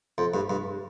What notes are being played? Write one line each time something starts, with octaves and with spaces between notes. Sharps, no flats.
F2
G2
G2